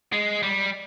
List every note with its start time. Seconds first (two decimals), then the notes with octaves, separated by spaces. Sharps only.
0.12 G#3
0.43 G3